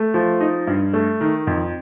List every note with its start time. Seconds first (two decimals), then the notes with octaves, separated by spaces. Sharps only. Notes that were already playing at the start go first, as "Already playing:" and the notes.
Already playing: A3
0.14 F3
0.41 D#4
0.67 G2
0.93 A3
1.21 D#3
1.47 F2